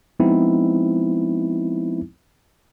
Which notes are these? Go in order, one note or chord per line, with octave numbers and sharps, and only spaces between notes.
F3 G#3 B3 C4 D#4 E4